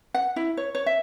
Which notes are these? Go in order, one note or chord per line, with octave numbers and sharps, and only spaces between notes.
F#5
E4
C#5
C#5
E5